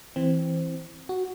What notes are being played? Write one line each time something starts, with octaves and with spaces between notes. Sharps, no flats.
E3 C4
F#4